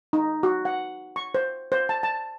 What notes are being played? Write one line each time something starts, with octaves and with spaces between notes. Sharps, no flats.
D#4
F#4
F#5
C#6
C5
C5
A5
A5